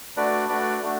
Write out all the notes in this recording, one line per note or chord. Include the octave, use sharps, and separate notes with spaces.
A3 D4 F#4 B4 D5
A3 D4 F#4 B4 D5
A3 D4 F#4